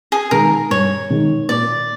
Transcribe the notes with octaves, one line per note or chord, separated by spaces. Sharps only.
G#4
D#3 G#3 A#4
G2 C#5
D#3 G#3
A#2 D5